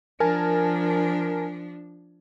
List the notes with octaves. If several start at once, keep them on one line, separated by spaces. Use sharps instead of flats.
F3 D4 A#4 G#5 A5